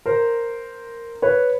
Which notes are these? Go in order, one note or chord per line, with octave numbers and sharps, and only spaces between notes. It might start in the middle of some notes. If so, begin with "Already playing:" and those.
A#4 C5
B4 C#5